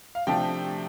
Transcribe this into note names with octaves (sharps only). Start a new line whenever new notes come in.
F5
C3 F3 A3 D4 G5